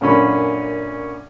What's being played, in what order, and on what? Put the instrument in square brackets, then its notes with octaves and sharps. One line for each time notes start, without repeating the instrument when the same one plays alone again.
[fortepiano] F#2 A#2 D3 C#4 B5